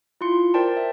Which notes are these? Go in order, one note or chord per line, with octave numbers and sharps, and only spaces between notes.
E4 F4 C6 C#7
A#4 C5 D5 G5 A5
E5